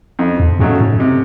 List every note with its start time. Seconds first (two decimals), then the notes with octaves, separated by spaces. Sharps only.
0.19 F2
0.40 E2
0.59 G2 C#3 F#3 A3
0.80 G#2
1.00 C3